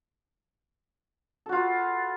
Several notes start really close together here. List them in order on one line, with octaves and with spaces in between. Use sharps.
A4 F#4 F4 B4